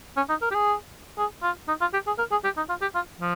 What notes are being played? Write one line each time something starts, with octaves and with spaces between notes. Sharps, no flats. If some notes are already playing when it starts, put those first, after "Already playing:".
C#4
D#4
A#4
G4
G#4
G#4
F4
D#4
F4
G4
G#4
A#4
G#4
G4
D#4
F4
G4
F4
F3